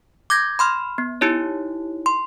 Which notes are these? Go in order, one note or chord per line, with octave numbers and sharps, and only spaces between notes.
D6 G6 G#6 A#6
B5 C6 F6
B3
D#4 E4 G4 C#5
C6